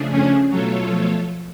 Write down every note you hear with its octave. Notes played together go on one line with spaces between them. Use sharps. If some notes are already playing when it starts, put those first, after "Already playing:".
Already playing: C#3 F3 A3 D4 G#4
C#4
B2 F#3 A3 F4 A4 C#5
F3